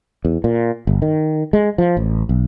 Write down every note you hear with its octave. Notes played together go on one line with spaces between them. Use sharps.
E2
A#2
G1
D#3
G#3
F3
A1
B1